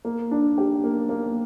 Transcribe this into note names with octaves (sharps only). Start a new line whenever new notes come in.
A#3
D4
G4
A#3
A#3